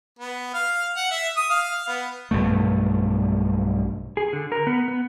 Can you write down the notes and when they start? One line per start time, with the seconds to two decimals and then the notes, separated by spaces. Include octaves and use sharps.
0.19 B3
0.54 F5
0.97 F#5
1.11 E5
1.37 D#6
1.50 F5
1.88 B3
2.31 B1 G2 B2 A3
4.17 G#4
4.33 D3
4.52 A#4
4.67 B3
4.88 B3